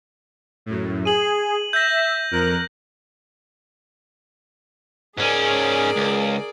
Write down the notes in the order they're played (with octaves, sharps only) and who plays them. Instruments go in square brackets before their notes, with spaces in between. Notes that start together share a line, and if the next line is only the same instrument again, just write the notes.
[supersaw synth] F#2 A2
[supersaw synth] G#4 [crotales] D#7 F#7
[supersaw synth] E5 [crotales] G6 A#6
[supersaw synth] F2 A#4 F#6
[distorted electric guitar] G#2 C#4 [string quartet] G#4 A#4 D5
[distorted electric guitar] C#2